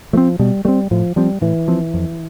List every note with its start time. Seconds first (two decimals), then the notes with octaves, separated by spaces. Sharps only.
0.13 F3 A3
0.17 C4
0.40 B2 G3
0.65 G3 A3 C4
0.91 A2 F3
1.16 F3 G3 C4
1.41 A2 E3
1.68 F3 C4
1.94 F2